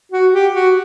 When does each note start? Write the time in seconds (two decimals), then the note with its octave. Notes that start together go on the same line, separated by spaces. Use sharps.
0.12 F#4
0.33 G4
0.54 F#4